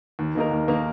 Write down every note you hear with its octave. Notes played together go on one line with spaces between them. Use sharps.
D#2
D#3 A#3 D#4 A#4
D#2
D#3 A#3 D#4 A#4